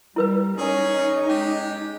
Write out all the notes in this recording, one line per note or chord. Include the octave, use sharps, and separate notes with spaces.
G3 E4 A#4 B4
C#4 D#4 G#4
G#3 G4